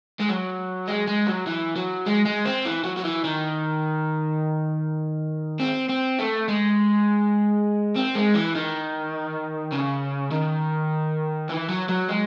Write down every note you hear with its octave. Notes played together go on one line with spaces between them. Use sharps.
G#3
F#3
G#3
G#3
F#3
E3
F#3
G#3
G#3
C4
E3
F#3
F#3
E3
D#3
C4
C4
A3
G#3
C4
G#3
E3
D#3
C#3
D#3
E3
F#3
F#3
G#3